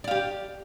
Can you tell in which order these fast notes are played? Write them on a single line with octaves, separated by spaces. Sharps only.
D5 F5 G4